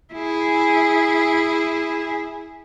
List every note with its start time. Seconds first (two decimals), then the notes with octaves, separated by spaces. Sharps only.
0.14 E4 G#4